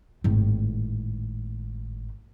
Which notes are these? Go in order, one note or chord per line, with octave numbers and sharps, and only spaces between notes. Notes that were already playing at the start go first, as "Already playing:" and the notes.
G#1 A2